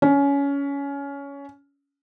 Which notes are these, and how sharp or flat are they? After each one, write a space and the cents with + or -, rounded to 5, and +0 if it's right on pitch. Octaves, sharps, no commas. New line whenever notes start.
C#4 +20